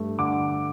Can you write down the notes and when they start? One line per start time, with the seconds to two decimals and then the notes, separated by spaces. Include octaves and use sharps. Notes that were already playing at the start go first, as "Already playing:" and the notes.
Already playing: G2 A3
0.18 D3 D6